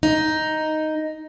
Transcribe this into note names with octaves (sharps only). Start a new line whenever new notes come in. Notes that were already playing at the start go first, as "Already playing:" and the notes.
D#4